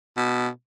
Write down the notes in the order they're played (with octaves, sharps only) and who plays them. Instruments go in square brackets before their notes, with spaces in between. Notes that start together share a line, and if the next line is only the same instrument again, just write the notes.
[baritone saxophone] B2